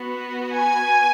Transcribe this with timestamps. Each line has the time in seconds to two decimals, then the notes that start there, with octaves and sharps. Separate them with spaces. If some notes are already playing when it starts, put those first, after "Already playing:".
Already playing: B3 F#4
0.56 G#5